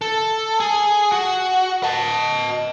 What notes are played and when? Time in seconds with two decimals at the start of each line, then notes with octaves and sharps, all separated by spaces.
0.01 A4
0.60 G#4
1.12 F#4
1.84 D#5 A5